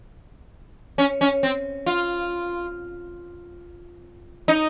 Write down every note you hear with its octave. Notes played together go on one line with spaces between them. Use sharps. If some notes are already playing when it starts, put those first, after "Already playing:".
C#4
C#4
C4
F4
D#4